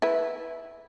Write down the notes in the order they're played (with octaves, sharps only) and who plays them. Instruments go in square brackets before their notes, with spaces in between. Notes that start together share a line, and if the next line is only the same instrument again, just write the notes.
[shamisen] E4 B4